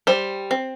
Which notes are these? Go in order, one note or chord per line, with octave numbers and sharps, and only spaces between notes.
G3 C5
C4